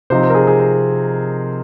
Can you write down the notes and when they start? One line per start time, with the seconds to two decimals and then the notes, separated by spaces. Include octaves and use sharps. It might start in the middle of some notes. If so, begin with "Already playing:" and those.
0.10 C3 F3 C4 D#4 C5
0.23 C5
0.30 A#4
0.35 G#4
0.47 G#4
0.59 C5